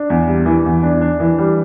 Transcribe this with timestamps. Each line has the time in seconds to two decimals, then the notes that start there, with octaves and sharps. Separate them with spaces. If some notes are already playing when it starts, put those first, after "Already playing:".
Already playing: D4
0.10 E2
0.27 G3
0.46 E3
0.65 E2
0.83 D4
1.01 D4
1.20 E3
1.38 G3